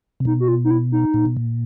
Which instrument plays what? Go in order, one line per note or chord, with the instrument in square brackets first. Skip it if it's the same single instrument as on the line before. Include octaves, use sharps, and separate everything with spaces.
[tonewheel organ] C3
[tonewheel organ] B2 [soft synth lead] D#4
[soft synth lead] F#4
F4
D#4
E4
D#4
[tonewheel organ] A#2
B2
A#2